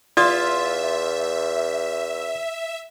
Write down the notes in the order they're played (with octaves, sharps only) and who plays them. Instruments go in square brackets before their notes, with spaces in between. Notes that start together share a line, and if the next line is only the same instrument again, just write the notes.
[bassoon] E2 [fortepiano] F4 [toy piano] D5 D#6 [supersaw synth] E5